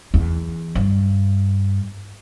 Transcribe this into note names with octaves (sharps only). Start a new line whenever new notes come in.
E2
G2